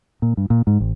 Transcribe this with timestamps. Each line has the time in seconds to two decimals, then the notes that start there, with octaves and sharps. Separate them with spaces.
0.22 A#2
0.37 G2
0.50 A#2
0.67 G#2
0.80 A1